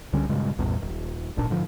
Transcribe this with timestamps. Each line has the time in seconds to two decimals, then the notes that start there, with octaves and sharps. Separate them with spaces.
0.13 C#2 D3 G3 C#4
0.29 G2 A#2 C#3 G#3
0.58 A1 E2 G2 A#2
0.81 D#1
1.37 D1 G#1 A#2 D4
1.50 G#2 D3 F3